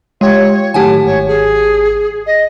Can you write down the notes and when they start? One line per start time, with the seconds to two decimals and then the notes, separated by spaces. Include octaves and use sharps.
0.21 G#3 F4 G4 C#5
0.74 A2 D#3 F#3 G4 F#5 G#5 A5
1.06 G#1 C#5
1.28 G#4
2.27 D#5